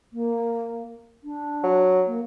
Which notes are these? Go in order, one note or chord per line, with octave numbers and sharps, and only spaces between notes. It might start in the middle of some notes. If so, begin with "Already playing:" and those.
A#3
D4
F#3
A#3